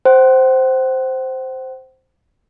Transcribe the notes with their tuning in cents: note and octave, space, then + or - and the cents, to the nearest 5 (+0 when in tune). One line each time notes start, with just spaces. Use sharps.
C5 +0 F#5 +45